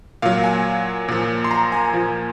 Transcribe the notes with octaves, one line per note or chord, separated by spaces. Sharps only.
A#2 F#3 F5
G#5
A#2 F3
C6
A#5
G#5
A#2 F3